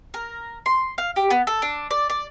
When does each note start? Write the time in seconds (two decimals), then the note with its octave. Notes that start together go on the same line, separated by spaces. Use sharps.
0.14 A#4
0.66 C6
0.98 F5
1.16 G4
1.30 B3
1.47 A4
1.62 D4
1.91 D5
2.10 D5